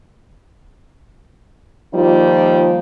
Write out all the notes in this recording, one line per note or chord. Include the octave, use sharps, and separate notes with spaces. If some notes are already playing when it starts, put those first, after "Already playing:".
D#3 F3 G3 A#3 D#4 F4